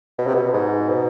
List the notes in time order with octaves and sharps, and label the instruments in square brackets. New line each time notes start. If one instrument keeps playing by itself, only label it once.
[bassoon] B2
C3
B2
G#2
B2